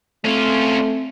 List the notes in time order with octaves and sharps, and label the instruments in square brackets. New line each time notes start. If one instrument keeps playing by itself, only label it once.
[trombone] A3 [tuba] C4 [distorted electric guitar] C#4 F4